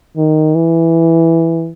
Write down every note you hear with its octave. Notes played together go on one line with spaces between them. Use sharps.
D#3
E3